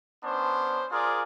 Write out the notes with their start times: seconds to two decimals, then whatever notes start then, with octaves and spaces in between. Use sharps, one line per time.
0.24 B3 C#4 D4 C5
0.92 F4 G#4 A#4 D5